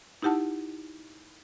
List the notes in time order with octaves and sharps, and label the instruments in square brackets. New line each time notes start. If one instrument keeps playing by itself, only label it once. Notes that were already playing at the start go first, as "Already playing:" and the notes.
[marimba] D#4 E4 G4 F#5 A5